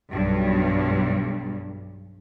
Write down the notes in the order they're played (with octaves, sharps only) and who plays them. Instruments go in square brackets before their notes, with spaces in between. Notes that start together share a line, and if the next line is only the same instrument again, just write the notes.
[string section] B1 G2